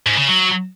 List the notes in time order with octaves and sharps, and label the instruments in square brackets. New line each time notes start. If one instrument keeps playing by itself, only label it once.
[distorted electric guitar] G#2
C#3
F#3